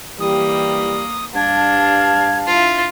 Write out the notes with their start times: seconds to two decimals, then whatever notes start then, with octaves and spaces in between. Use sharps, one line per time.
0.20 E3 G3 A#3 G4 D#6
1.35 G2 D4 F5 A5 G#6
2.47 E4 F4